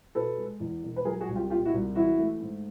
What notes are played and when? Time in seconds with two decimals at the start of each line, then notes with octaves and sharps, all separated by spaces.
0.15 B2 A4 B4
0.38 G#3
0.60 E2
0.83 E1
0.96 B4
1.05 F#3 G#4 A#4
1.20 F#4 G#4
1.28 C2
1.35 F4 G4
1.50 A#2 F4 G4
1.65 E4 F#4
1.73 C2
1.95 E3 E4 F#4
2.18 A3
2.41 G#2